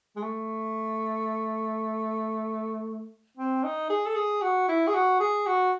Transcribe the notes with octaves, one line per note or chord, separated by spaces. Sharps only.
G#3
A3
C4
D#4
G#4
A4
G#4
F#4
E4
G#4
F#4
G#4
F#4